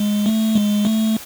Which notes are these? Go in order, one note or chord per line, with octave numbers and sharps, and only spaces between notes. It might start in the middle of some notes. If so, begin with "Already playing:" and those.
Already playing: G#3
A3
G#3
A3